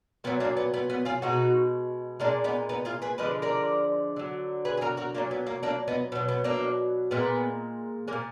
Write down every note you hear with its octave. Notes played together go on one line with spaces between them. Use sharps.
A#2 F#3 B3
A#3 D4
B3
B3
B3
F4 G#4
B2 G#3 D#4 F#4
A#2 G#3 A#3 D4
B3 D#4
B3 D#4
F4 G#4
G#4 B4
D3 F3 G#3 B4 D#5
A#4 D5
D3 F#3
G#4 B4
G#4
F#4 A#4
F#4 A#4
A#2 F#3 A#3 D4
B3
A#3
A#3 D4
B3 D#4
B2 F#3 B3
B3
A#3 D4
A#2 G#3 B3
G#3 A#3
A#2